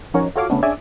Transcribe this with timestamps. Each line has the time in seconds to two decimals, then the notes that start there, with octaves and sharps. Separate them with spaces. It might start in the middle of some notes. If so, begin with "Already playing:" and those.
0.14 F3 C#4 D#4 F#4 A#4 C#5
0.36 F4 F#4 A4 C#5 F5 D6
0.50 C#3 A3 B3 C#4 D4
0.63 C#4 D4 G#4 D5 E5 G#5